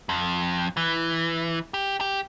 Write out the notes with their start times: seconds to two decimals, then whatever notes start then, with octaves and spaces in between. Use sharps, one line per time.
0.09 F2
0.77 E3
1.74 G4
2.01 G4